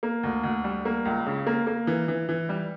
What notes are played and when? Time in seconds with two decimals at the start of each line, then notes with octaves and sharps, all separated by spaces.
0.03 A#3
0.23 D2
0.43 D2
0.64 G3
0.85 A#3
1.05 C#2
1.26 C#3
1.47 A#3
1.67 A#3
1.87 E3
2.08 E3
2.29 E3
2.49 G3